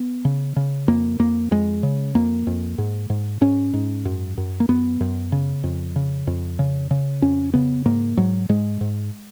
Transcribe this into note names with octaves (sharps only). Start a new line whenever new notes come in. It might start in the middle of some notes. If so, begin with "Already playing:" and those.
Already playing: B3
C#3
C#3
F2 A#3
F2 A#3
F2 G#3
C#3
F2 A#3
F2
G#2
G#2
G#2 C#4
G#2
F#2
F#2
A#3
F#2 B3
F#2
C#3
F2
C#3
F2
C#3
C#3
F2 C#4
C#3 B3
G#2 A#3
G#2 F#3
G#2 G#3
G#2